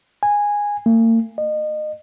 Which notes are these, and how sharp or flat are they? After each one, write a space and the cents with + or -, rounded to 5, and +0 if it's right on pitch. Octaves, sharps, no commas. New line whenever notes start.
G#5 -10
A#3 -45
D#5 -30